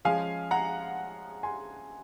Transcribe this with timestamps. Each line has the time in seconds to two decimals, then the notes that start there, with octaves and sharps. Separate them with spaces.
0.05 F3 G#3 C#4 F5 G#5
0.51 F#5 A#5
1.43 G#5 C6